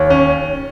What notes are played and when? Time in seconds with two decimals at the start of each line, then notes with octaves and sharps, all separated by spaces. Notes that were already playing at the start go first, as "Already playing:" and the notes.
Already playing: D#2 C#5
0.10 C#4